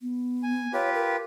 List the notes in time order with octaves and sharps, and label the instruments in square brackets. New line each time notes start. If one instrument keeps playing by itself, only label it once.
[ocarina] B3
[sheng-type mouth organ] G#5
[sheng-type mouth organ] F4 G4 B4 [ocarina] C#5
[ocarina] A#4